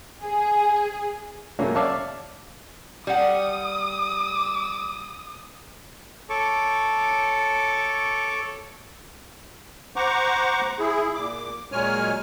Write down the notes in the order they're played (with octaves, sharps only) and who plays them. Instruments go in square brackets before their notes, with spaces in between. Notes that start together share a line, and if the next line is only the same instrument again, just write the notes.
[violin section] G#4
[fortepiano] F#2 C#3 F#3 A3 A#3 C#4
C#5 D5 E5 F5 A5 D6
[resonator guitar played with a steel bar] G3 F#5 [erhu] D#6
[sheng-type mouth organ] A4 C#5 A5 C#6 D6
[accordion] C5 F#5 A#5 C#6 D6
E4 G#4
A#2 D6
A#2 F#3 G#3 C#5 G#5 F6